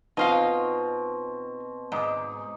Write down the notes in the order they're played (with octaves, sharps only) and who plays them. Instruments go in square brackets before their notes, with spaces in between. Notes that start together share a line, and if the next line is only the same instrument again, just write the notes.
[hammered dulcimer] B2 C4 [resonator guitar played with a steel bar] D#4 F4 F5
[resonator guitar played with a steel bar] G#2 [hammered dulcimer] D#4 D6